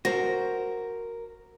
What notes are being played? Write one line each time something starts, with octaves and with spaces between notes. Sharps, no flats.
F#4 A#4 C5 A#6